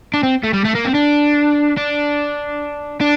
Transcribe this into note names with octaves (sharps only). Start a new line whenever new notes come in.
D4
C4
A3
G3
A3
A#3
C4
D4
D4
D4